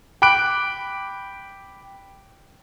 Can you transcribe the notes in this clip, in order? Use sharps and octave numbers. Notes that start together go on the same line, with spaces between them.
G5 B5 D6 F#6 D7